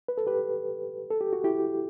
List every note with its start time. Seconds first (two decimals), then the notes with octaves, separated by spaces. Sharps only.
0.08 B4
0.18 A4
0.27 G4 B4
1.11 A4
1.21 G4
1.33 F#4
1.44 E4 G4